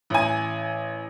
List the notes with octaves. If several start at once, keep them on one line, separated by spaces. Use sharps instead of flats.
A1 G#5